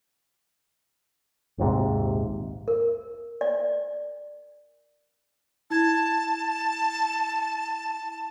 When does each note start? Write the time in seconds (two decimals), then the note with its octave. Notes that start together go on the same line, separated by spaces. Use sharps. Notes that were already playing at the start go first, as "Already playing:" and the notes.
1.58 A#1 D#2 G#2 C3
2.68 A#4
3.41 D5
5.70 E4 A5 G#6